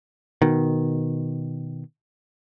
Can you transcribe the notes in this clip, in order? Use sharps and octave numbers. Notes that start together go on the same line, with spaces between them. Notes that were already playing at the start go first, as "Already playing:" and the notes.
B2 D#3